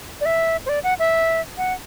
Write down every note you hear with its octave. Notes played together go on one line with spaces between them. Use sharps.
D5
E5
C5
D5
F#5
E5
F#5